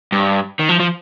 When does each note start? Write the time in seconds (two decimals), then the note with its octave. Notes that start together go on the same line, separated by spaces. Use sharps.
0.12 G2
0.59 D#3
0.69 F3
0.80 F3